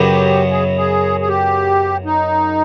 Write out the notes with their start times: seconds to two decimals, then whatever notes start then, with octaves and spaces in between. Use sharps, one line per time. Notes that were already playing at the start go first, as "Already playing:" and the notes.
Already playing: F#2 C#3 F#3 B3 G4
0.50 G#4
0.78 G#4
1.21 G#4
1.28 G4
2.05 D#4